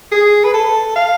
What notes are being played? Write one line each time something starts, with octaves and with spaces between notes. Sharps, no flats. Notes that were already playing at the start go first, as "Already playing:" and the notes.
G#4
B4
A4
F5